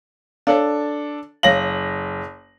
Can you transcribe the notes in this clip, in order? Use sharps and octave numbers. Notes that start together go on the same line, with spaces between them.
D4 A4 C#5 F5
F#1 C#5 F5 A#6 F#7